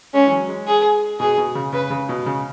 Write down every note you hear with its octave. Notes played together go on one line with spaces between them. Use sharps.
G#3 C#4
E3
F#3
G#3
G#4
B2 G#4
B2
C#3
C#3 B4
C#3
B2
C#3